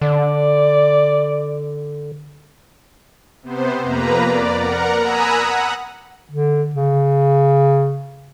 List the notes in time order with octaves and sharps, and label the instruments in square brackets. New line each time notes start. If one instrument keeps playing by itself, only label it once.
[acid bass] D3 [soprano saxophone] D5
[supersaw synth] C3 B3 C5
F2 A#3 B4 A#5
D5
A#4 F#5 A#5
G#5 A#5 B5 D#6 E6 F#6
F#5
[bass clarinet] D3
C#3